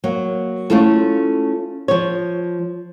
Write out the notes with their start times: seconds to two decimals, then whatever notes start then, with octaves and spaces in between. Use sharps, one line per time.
0.04 F#3 A#3
0.70 A3 C#4 E4 F4 A4
1.88 F3 C#5